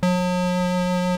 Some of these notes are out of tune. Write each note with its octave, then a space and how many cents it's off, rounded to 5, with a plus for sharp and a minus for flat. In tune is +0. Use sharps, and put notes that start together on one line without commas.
F#3 -45